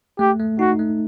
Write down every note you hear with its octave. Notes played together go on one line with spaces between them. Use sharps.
A3 G4
A3
D#4 F#4
A3